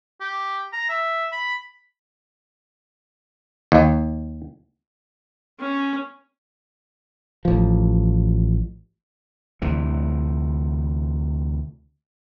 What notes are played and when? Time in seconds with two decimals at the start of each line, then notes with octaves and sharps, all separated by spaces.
0.20 G4
0.72 A#5
0.89 E5
1.32 B5
3.72 D#2
5.60 C#4
7.45 A1 F3
9.62 D2 C3 E3